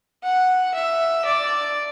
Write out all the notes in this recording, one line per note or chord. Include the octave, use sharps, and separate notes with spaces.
F#5
E5
D5